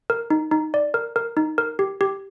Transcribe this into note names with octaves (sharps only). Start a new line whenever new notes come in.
A#4
D#4
D#4
D5
A#4
A#4
D#4
A#4
G4
G4